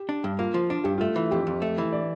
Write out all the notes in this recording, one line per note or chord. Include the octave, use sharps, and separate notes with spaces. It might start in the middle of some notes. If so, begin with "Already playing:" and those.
Already playing: G4
D4
G2
A#3 F4
F3
D4 F4
G2 G4
A3 F4
E3
F2 G4
F2
A3
E3
D5